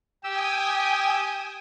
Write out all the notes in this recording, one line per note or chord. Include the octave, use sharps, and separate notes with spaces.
G4 G5 G#5 D#6 E6